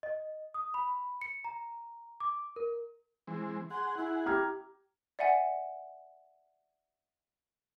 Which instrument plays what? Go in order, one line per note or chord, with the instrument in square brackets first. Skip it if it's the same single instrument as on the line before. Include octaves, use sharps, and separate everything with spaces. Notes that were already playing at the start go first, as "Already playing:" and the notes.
[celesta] D#5
D#6
B5
C#7
A#5
D6
A#4
[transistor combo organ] E3 G#3 C4
[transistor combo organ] G#4 F#5 [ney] C6
[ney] E4
[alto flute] G4 [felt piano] A#5 F6 G#6
[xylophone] D5 E5 F#5 G#5